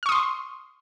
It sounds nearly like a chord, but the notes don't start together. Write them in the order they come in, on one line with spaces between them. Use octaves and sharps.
F6 C#6 D#6 C6